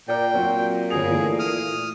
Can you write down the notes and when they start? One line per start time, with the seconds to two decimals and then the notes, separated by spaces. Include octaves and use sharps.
0.08 A#2 A#4 D5 G5
0.34 F#3 C4 F#4
0.90 G1 G#4 F7
1.10 E3 A3
1.39 D#6 F6